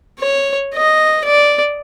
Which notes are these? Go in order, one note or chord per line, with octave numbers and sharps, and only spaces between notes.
C#5
D#5
D5